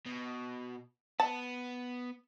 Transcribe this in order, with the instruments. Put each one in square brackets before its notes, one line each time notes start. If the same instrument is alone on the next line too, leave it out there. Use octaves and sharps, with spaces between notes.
[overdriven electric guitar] B2
[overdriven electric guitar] B3 [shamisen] A5